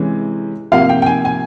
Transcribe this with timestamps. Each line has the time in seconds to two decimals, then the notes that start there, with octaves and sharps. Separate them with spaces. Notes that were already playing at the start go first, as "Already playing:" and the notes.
Already playing: C3 E3 G#3 C#4
0.72 C3 F3 A#3 F5
0.89 G5
1.02 G5
1.06 G#5
1.25 G#5